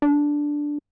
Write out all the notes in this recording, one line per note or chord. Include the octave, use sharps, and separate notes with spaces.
D4